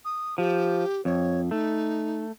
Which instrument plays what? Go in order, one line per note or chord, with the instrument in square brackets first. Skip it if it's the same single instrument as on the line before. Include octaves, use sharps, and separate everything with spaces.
[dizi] D#6
[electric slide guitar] F3 [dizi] G4
[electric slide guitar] F2 [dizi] C#5
[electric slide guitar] A3 [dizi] D#4